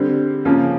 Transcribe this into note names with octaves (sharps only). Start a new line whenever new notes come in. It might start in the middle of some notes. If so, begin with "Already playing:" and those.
Already playing: D3 G3 C4
C#3 F3 A#3 C#4 F4